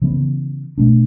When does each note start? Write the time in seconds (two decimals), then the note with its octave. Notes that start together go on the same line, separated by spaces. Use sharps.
0.02 C#3 E3 B3
0.78 B2 A3 D4